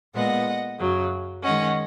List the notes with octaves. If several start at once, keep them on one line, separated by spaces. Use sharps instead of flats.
A#2 G#3 B3 D#5 F#5
F#2 C#3 F#3
D#3 G#3 C#4 D#5 F#5